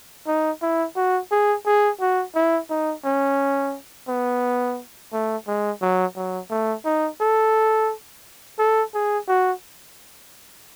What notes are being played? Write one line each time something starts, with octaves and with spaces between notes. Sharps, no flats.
D#4
E4
F#4
G#4
G#4
F#4
E4
D#4
C#4
B3
A3
G#3
F#3
F#3
A3
D#4
A4
A4
G#4
F#4